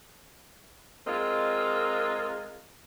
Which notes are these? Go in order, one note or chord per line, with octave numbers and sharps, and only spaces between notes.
G#3 C4 F4 A#4 D#5